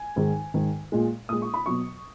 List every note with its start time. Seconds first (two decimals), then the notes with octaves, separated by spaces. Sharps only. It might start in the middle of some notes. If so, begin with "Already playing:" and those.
Already playing: G#5
0.16 G#2 D#3 G#3
0.54 G#2 D#3 G#3
0.92 A#2 G#3
1.29 A#2 G#3 D#6
1.42 C#6
1.54 B5
1.66 B2 F#3 C#6